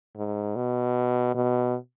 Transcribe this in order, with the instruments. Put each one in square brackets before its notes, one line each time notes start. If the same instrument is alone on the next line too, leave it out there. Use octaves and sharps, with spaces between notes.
[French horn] G#2
B2
B2